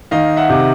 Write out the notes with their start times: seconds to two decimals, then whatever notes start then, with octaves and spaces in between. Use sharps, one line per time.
0.11 D#3 D#5 F5
0.36 E5 F#5
0.50 C3